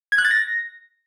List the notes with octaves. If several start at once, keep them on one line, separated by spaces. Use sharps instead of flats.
G#6
F#6
A6
A#6